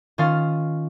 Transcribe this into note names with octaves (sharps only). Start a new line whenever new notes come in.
D#3 C#4 F4 F5 A6